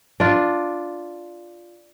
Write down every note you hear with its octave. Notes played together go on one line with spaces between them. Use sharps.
D4 F4